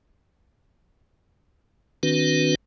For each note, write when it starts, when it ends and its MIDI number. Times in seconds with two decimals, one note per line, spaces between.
2.03 2.55 51
2.03 2.55 60
2.03 2.55 62
2.03 2.55 66
2.03 2.55 71